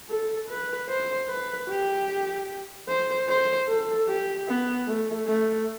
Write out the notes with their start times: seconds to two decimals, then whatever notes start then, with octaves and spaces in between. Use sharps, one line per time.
0.10 A4
0.49 B4
0.89 C5
1.29 B4
1.69 G4
2.89 C5
3.29 C5
3.69 A4
4.08 G4
4.48 B3
4.88 A3
5.28 A3